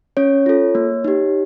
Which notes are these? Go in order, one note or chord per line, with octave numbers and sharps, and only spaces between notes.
C#4 C#5
F4 A4
A#3
D#4 G4